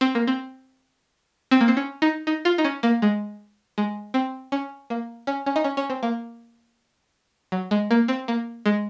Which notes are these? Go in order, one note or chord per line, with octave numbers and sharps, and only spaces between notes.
C4
A#3
C4
C4
A#3
C4
C#4
D#4
D#4
F4
D#4
C#4
A#3
G#3
G#3
C4
C#4
A#3
C#4
C#4
D#4
C#4
C#4
C4
A#3
F#3
G#3
A#3
C4
A#3
G#3